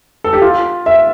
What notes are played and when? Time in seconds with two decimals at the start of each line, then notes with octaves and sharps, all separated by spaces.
0.24 A4
0.33 G4
0.42 F4
0.86 E5